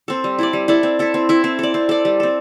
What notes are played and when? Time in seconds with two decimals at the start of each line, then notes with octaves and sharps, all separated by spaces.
0.08 C4 A4
0.24 G3
0.39 E4 A4 D5
0.53 G3
0.68 E4 A4 D5
0.83 C4
0.99 E4 A4 E5
1.14 C4
1.29 E4 A4 E5
1.44 C4
1.59 A4 D5
1.74 C4
1.89 A4 D5
2.05 G3
2.20 C4 A4